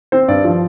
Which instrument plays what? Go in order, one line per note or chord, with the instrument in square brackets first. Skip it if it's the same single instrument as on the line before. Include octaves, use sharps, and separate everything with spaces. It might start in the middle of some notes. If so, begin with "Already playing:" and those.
[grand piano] C4 C5
G2 D5
F3